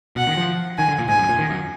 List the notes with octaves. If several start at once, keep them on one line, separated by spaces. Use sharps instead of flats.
B2 F#5
D#3
F3
D#3 G#5
D3
A#2
G#2 G#5
F#2
A#2
D#3
F#2